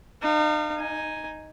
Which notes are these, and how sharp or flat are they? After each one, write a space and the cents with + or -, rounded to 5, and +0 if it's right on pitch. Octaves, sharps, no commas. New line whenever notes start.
D#4 -40 F5 -20
D#4 +0 G#5 +0